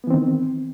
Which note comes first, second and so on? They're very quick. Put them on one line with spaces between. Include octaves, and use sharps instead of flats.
B3 E3 C4 D#3